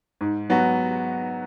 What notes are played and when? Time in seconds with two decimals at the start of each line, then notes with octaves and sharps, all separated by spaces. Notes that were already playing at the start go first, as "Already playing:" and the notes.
0.21 G#2
0.50 F#3 B3 F#4 B4